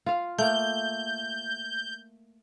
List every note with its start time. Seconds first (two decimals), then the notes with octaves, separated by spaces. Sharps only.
0.06 F4 F5
0.38 A3 A#3 G6